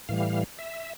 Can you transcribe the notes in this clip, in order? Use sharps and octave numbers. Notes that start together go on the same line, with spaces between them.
A2 E3 G3 F5
E5